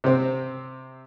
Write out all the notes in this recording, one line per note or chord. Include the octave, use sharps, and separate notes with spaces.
C3 C4